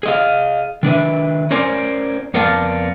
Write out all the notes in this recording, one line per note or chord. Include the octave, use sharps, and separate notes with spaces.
G#4 D#5 F5
D#3 D4 B4 E5
C#4 A#4 C5 D5 G#5
F2 B3 A#4 D5 F5 A5